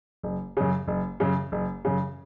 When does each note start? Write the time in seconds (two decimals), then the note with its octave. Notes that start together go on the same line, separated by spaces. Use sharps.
0.23 F#1
0.57 F#2 C#3
0.88 F#1
1.20 F#2 C#3
1.52 F#1
1.85 F#2 C#3